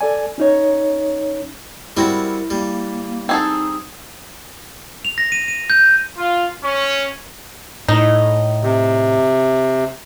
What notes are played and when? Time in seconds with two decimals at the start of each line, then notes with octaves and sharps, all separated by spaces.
0.01 A4 D5 G#5
0.38 C#4 D#4 C#5
1.97 G3 C4 E4 F#4 A#4
2.50 G3 A#3
3.29 C4 D#4 G#4 A4
5.05 F7
5.18 A#6
5.32 D#7
5.48 D#7
5.70 G6
6.16 F4
6.63 C#4
7.88 A2 D#4
8.63 C3